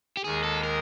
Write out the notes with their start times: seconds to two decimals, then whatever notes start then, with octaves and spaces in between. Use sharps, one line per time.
0.17 G4
0.24 D#2 D#3 G#3 G#4
0.44 A4
0.63 A#4